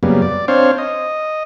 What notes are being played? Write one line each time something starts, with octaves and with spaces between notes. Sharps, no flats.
F#2 C#3 G3 A#3 B3
D5
C4 D4 C5 C#5 F5
D#5